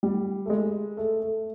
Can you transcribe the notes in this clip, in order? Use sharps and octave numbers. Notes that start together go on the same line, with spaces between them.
G3
A3
G#3
A3
A3